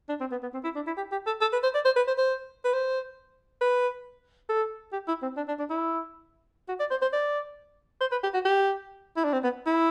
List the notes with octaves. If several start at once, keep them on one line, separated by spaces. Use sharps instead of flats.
D4
C4
B3
B3
C4
E4
D4
E4
G4
G4
A4
A4
B4
C5
D5
C5
B4
C5
C5
B4
C5
B4
A4
G4
E4
C4
D4
D4
D4
E4
F#4
D5
C5
C5
D5
C5
B4
G4
F#4
G4
E4
D4
C4
B3
E4